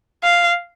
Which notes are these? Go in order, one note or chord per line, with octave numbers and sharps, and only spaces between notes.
F5